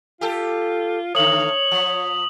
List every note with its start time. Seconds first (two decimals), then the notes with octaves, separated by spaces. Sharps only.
0.21 F4 G4 A4
1.15 D3 A3 C#5 D#6 F#7
1.71 F3